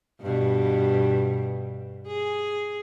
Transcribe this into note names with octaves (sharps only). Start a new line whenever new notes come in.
G2 B2
G#4